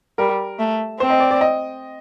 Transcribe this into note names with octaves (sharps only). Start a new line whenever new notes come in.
G3 A#4
A3
C4 C5
D#5
D5
D5
D#5